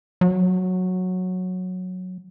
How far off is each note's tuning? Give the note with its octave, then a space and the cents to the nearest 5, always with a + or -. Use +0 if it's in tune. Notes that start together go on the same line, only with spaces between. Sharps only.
F#3 -10